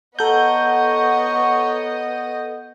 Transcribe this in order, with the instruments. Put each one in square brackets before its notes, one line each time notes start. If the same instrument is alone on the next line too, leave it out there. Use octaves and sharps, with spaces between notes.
[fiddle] B3 D#5 [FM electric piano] A4 G6 [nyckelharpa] C#5 C#6 [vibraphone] F#5 A#5